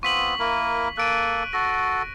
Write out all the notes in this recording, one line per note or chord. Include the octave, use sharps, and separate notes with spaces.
B3 C4 F4 C#6 B6 F#7
A#3 E4 A#4
A#3 A4 F#6 D7 D#7
F#4 A4 A#6